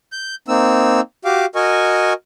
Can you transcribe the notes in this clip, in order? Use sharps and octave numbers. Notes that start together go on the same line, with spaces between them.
G6
A#3 C4 D#4 E6
F#4 G4 F5 D6
F#4 A#4 D#5 G#5 C#6